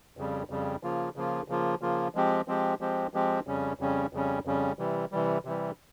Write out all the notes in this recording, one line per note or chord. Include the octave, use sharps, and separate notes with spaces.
F2 C#3 G3
F2 C#3 G3
C#3 F3 A#3 F4
C#3 F3 A#3 F4
C#3 F3 A#3 F4
C#3 F3 A#3 F4
F3 G#3 C4 G4
F3 G#3 C4 G4
F3 G#3 C4 G4
F3 G#3 C4 G4
F2 C#3 G3 C#4
F2 C#3 G3 C#4
F2 C#3 G3 C#4
F2 C#3 G3 C#4
C3 E3 G3
C3 E3 G3
C3 E3 G3